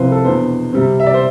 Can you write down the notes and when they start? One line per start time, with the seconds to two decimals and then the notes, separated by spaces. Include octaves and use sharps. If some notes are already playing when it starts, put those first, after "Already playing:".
Already playing: C2 C3 F3 C4 B4 C5
0.12 A4
0.25 E2 B2 B3 D4 C5
0.73 C3 G3 C4
1.00 E5
1.07 D5
1.14 C5